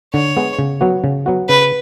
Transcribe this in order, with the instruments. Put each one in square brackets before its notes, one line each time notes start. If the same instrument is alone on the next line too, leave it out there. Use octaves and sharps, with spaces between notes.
[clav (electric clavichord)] D3 [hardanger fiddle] C#5
[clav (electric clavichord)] G#3 B3
C#3
F#3 B3 F#4
C#3
F#3 B3 F#4
[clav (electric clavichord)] C#3 [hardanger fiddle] B4